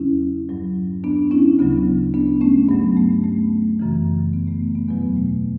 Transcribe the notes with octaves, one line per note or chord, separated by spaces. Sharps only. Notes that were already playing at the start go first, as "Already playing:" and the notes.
Already playing: E2 C#3 F#3 C#4 E4
G2 F#3
B3 D4
C#4 E4
D2 C#3 F#3 B3
B3 D4
A3 C#4
G2 F#3 B3
A3
A3
F#2 C#3 E3
B3
A3
B3
E2 B2 F#3 B3
A3